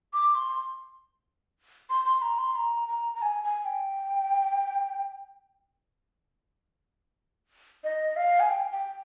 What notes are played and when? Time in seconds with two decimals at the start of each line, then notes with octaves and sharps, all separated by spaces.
0.14 D6
0.35 C6
1.90 C6
2.05 C6
2.22 A#5
2.39 C6
2.56 A#5
2.88 A#5
3.15 A#5
3.22 G#5
3.44 G#5
3.65 G5
7.84 D#5
8.16 F5
8.40 G#5
8.50 G5
8.72 G5